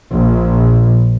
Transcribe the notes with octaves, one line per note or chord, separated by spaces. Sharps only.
A#1